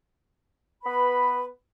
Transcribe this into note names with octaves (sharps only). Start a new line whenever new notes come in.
B3 B4 B5